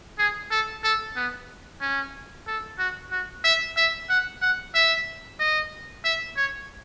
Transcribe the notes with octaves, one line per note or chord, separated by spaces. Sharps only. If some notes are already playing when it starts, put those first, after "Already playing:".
G#4
A4
A4
B3
C#4
A4
F#4
F#4
E5
E5
F#5
F#5
E5
D#5
E5
C#5